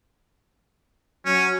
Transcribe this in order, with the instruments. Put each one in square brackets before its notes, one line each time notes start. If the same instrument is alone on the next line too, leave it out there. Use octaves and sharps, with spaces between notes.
[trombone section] F#3 [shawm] C#4